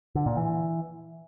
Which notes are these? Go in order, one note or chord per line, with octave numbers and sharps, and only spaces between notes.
D3
A#2
E3